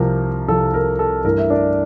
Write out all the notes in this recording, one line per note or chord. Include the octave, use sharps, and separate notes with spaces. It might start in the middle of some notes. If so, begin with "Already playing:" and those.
Already playing: C2 C3 F3 A#4
C2 C3 F3 A4
A#4
A4
G2 E3 A3 A#4
E5
D4 D5